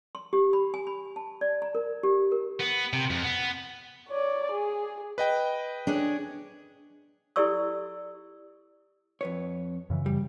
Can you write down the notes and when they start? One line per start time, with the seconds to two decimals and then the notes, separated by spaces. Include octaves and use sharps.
0.15 C6
0.33 G4
0.53 B5
0.74 G#5
0.87 B5
1.16 A5
1.41 D5
1.62 A#5
1.75 A#4
2.03 G4
2.32 A#4
2.60 B3
2.93 C3
3.10 F2
3.24 B3
4.08 C#5 D5
4.52 G#4
5.18 B4 D#5 G5
5.87 D4 G#4 C#5
7.36 E4 G4 A4 D5 C#6 E6
9.21 F2 B4 C#5
9.90 F#2 C#3 E3
10.06 G3